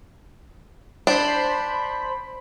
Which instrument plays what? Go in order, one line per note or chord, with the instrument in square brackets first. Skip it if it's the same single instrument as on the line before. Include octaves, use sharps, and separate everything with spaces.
[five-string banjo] D4 [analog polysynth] C5 B5